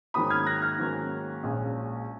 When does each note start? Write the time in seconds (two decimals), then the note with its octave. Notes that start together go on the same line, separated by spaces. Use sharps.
0.14 G#2 D#3 F#3 A#3 C#4 B5 D#6
0.30 F6 G#6
0.47 F#6 A#6
0.62 F6 G#6
0.78 G#2 D#3 F#3 A#3 C#4
1.43 A#1 A#2 G#3 C#4